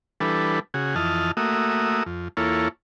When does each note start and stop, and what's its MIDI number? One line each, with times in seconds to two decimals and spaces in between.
0.21 0.60 52
0.21 0.60 55
0.21 0.60 62
0.21 0.60 69
0.21 0.60 71
0.74 0.95 49
0.74 0.95 66
0.74 0.95 68
0.96 1.31 41
0.96 1.31 52
0.96 1.31 75
0.96 1.31 81
0.96 1.31 89
1.37 2.03 57
1.37 2.03 58
1.37 2.03 66
1.37 2.03 76
1.37 2.03 87
2.06 2.28 41
2.37 2.68 40
2.37 2.68 58
2.37 2.68 64
2.37 2.68 65
2.37 2.68 69
2.37 2.68 73